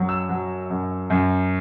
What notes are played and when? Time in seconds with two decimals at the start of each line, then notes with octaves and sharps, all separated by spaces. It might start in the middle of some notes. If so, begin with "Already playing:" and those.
Already playing: F#2 F#3
0.09 E6
0.29 F#3
0.70 F#2
1.10 F#2